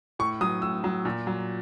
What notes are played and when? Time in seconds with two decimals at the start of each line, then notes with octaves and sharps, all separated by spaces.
0.19 A2 C#6
0.41 F#3 D#6
0.62 A2 E6
0.84 F#3
1.05 A#2
1.27 F#3